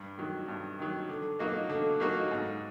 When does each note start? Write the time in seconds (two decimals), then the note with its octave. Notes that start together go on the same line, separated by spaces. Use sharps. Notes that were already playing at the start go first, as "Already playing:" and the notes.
Already playing: G2
0.18 D#3 F#3
0.48 G2
0.79 D#3 F#3
1.09 D3
1.39 F#3 A#3 D#4 F#4
1.69 D3
2.00 F#3 A#3 D#4 F#4
2.31 G#2